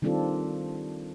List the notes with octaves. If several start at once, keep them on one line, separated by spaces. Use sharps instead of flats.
D#3 G3 C4 D4 F4 A4